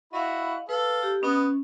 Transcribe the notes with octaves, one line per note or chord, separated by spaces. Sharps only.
E4 F#4 D#5 F5 B5
A4 B4 F5
G4
B3 C#4 D#5